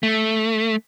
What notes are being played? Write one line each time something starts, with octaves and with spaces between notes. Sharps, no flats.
A3